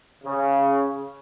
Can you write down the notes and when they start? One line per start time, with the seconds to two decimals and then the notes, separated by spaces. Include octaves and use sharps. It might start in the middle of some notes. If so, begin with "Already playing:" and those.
0.24 C#3